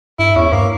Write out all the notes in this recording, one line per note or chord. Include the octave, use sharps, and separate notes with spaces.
G2 E4
E2 C#4
G2 A#3